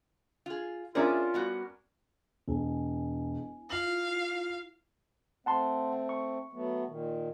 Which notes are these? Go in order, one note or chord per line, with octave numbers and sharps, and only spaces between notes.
F4 G#4
C#4 D4 F4 G#4 A#4 D5 E5
G3 B3 F#4
E1 E4 G#5
E4 F4 F5 F#7
A3 C4 F#5 A5 C6
C#6
F#3 A3 B3
A#2 D#3